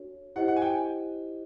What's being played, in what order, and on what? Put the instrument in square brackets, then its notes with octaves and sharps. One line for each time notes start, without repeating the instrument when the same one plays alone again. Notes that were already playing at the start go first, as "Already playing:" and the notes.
Already playing: [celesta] D4 F#4 A4 C#5
[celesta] E4 G4 C5 D#5 [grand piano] F#5
[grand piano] F#5
G#5
G5